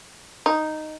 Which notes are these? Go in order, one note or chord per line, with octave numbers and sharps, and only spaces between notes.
D#4